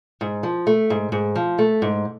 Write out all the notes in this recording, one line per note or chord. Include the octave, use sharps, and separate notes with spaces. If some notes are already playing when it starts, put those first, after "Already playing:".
G#2
F3
A3
G#2
G#2
F3
A3
G#2